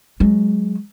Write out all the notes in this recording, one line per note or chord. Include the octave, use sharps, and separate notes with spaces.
F#3 G#3